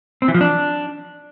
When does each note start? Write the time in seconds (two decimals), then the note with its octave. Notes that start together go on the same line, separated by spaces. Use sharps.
0.22 C4
0.28 E3
0.34 F3
0.41 D4